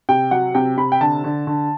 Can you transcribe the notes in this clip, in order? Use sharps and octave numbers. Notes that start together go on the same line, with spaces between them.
C3 G5
F#3 F#5
C3 G5
C3 B5
G5
D3 A5
D3
D3